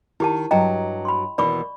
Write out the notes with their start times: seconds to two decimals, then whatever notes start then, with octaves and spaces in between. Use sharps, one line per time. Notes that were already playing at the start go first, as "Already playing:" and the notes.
0.20 D#3 E4 G4 A5
0.51 G2 F#3 D#5 G5 A#5
1.05 B5 C6
1.38 D#2 B2 E3 D5 B5 C#6